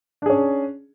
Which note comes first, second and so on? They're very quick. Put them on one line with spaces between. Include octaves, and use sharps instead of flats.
D4 G#4 C#4